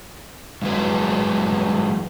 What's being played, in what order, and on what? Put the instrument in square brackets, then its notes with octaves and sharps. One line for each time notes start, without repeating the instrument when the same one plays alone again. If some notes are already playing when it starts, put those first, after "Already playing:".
[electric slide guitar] G2 A#2 E3 F#3 G#3 B4